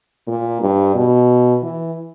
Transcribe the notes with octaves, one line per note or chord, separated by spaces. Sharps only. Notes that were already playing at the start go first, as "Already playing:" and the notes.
A#2
G2
B2
E3